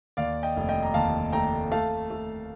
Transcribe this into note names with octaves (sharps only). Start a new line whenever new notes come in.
D#2 D5 F5
D#5 G5
F1
D#5 G5
A#5
D#2 F5 A5
A3 G5 A#5
A3 F5 A5
A3